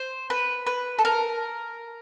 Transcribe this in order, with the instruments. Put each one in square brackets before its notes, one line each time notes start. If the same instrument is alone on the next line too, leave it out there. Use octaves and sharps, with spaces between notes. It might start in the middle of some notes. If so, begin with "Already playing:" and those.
Already playing: [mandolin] C5
B4
B4
A4
A#4